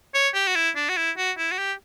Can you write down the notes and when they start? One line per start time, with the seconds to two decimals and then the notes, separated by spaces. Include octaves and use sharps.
0.14 C#5
0.34 G4
0.48 F#4
0.56 E4
0.76 D4
0.89 F#4
0.97 E4
1.17 F#4
1.38 E4
1.51 F#4
1.58 G4